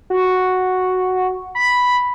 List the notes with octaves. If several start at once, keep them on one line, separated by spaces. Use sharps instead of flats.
F#4
B5